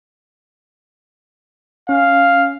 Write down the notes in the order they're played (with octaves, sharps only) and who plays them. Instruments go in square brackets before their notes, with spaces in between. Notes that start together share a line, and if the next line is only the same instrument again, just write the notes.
[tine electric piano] C#4 [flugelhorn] F5